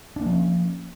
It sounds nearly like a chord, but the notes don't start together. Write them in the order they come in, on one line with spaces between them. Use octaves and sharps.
D4 A#3 F3 C#4